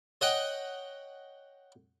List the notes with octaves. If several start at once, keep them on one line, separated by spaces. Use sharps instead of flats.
C#5 D#5 F#5 G5 C#6